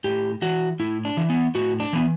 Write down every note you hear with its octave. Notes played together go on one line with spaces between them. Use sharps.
A2 G4
E3 F#4
A2 E4
D4
E3
B3
A2 F#4
D4
E3 B3